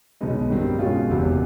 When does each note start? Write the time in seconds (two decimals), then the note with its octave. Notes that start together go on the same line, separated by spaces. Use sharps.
0.21 B1 B2 G#3 B3 D#4
0.50 G2 D#3 G3 C4
0.79 B2 G#3 C#4 F4
1.09 F#1 E2 C3